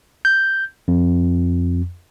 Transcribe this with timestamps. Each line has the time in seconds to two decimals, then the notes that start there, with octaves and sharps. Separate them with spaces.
0.25 G6
0.88 F2